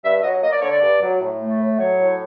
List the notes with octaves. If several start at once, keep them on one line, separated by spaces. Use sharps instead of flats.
G2 E5
F#3 D#5
A#3 D#5
D5
D3 C#5
D5
G2
F#3
A2
A3
A2
F#3 C#5
A2